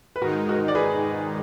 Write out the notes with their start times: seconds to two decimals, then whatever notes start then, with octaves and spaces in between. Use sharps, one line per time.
0.16 B4
0.21 G#2 D#3 G#3 D#4 F#4 A#4
0.49 F#4 A#4
0.68 D5
0.75 G#4 B4